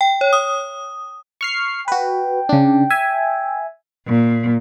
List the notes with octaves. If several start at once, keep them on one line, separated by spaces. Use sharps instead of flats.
G5
C#5
D#6
C#6 F6 C7
F#4 B4 G5
C#3 D4
E5 G#5
A#2